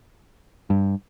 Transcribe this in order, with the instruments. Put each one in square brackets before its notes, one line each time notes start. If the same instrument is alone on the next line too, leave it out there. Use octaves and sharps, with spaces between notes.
[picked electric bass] G2